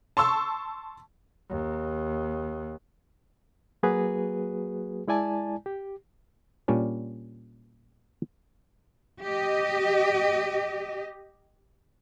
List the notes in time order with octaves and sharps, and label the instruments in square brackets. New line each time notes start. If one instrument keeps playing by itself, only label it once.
[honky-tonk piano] A5 C6 C#6 E6
[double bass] D#2
[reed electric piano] F#3 A#3 F#4 G#4 B4
G#3 E4 D5 G#5 A5
G4
[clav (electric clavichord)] A#2 G3 C#4 D4
[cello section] G4 D#5